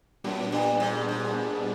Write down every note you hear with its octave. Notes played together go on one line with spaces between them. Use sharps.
F#2 A#2 G3 B3 D4
G2
G#2
G#2